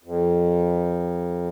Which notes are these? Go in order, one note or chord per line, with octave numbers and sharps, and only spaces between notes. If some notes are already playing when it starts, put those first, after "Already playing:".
F2